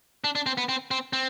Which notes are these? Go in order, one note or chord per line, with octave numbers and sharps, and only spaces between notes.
D4
D4
C4
B3
C4
C4
C4